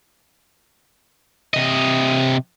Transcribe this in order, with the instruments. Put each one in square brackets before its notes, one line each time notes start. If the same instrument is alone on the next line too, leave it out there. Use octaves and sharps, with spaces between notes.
[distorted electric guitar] C3 D#5